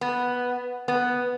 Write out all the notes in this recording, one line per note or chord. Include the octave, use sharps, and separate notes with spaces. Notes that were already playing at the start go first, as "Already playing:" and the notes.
B3
B3